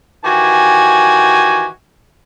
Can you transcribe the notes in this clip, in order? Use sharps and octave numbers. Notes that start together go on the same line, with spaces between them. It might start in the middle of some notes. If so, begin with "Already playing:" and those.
D#3 E3 F#4 G4 G#5